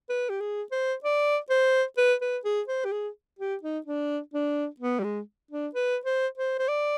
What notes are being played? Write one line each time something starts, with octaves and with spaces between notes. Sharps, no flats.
B4
G4
G#4
C5
D5
C5
B4
B4
G#4
C5
G4
G#4
G4
D#4
D4
D4
B3
G3
G#3
D4
B4
C5
C5
C5
D5